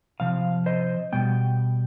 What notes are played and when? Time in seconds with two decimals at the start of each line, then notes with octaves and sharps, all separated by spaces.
0.20 C3 F3 F5
0.66 C5 D#5
1.12 B2 G3 B3 G5